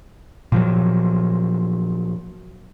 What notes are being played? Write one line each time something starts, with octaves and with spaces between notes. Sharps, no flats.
A#2 F3 F#3